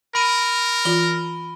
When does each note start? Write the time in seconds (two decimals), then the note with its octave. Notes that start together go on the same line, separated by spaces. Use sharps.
0.15 A#4 B5 D7 D#7
0.85 E3 F4 G7